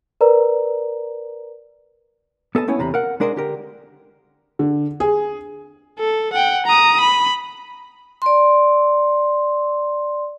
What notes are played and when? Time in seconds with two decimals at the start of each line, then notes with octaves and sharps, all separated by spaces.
0.21 A#4 B4 D5 A#5
2.55 B3 A4 D#5 A5
2.68 A3 B3 C#4 E4
2.79 E2 C3 A#5 B5
2.94 A#4 F5 F#5
3.20 G#3 D4 A#4 C5 D#5
3.36 D3 G4 A#4
4.59 D3
5.00 G#4
5.99 A4
6.33 F#5 G5
6.66 A#5 D#6
7.01 B5
8.22 D5 C6